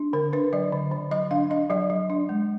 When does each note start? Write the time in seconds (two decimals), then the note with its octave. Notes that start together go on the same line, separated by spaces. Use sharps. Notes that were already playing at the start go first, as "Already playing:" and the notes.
Already playing: D4
0.13 D3 A#4
0.33 D4 B4
0.53 F#3 D5
0.72 D3
0.91 D3
1.11 F#3 D#5
1.31 D4 F5
1.50 D4 D#5
1.70 F#3 D5
1.90 F#3
2.10 D4
2.29 G#3